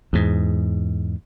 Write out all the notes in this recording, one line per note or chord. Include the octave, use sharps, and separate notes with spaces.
E2 G#2